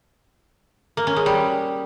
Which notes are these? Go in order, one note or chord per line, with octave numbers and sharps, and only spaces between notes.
A#3
C#4
G#3
G3